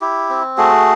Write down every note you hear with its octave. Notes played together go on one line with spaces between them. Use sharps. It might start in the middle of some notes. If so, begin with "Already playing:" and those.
E4 G4
C4
A3 F#4 G#4